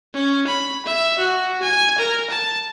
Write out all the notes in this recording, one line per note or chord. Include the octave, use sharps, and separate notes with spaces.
C#4
B5
E5
F#4
G#5
A#4
A5